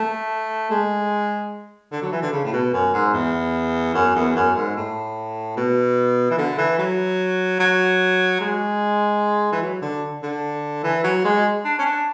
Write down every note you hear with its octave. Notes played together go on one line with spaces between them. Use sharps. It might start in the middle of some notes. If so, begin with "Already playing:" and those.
Already playing: A3
G#3
D3
F#3
E3
D3
C#3
A2
B2
F#2
G#2
E2
F#2
E2
F#2
G#2
A2
B2
E3
D3
E3
F#3
F#3
G#3
E3
F#3
D3
D3
E3
F#3
G#3
D4
C#4
D4